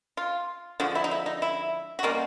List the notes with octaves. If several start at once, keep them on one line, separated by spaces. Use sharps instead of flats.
F4
D3 F3 G#3 F#4
E4
D#4
E4
D#4
E4
F#4
B2 G3 A#3 C#4 F4